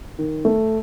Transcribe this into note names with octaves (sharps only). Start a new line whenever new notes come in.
D#3
A3